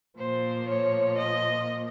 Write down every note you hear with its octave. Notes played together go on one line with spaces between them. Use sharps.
A#2 F3 A#3 C5
C#5
D#5